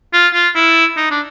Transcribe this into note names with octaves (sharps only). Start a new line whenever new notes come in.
F4
F4
E4
D#4
D4